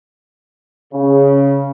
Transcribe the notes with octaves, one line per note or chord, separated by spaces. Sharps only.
C#3